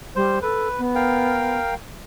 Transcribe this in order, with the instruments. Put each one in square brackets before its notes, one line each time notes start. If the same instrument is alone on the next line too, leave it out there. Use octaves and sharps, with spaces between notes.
[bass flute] G3 [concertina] C5
[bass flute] A4 [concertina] B4
[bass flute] B3
[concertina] A#4 F5 G5